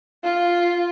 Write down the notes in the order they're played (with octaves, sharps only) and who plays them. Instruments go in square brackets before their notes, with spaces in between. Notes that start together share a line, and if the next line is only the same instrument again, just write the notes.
[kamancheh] F4